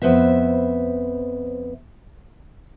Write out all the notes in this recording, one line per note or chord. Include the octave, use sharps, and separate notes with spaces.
F2 B3 B4 C5 E5